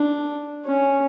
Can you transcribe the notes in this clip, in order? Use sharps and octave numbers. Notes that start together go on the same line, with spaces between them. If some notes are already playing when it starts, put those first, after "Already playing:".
Already playing: D4
C#4